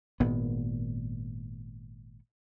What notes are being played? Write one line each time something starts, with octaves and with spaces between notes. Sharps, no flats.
G#1 A#2 B3